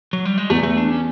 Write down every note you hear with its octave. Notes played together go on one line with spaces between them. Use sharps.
F#3
G3
G#3
E2 A3
A3
D4
C#4